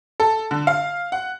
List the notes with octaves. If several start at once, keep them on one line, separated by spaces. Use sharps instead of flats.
A4
D3
F5
F#5